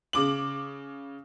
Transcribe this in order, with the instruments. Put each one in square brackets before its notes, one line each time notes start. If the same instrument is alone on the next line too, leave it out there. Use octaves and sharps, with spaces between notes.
[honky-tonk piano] C#3 D6 F#7